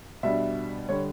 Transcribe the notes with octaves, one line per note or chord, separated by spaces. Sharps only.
B2 G3 D4 E5
D3 G3 C#5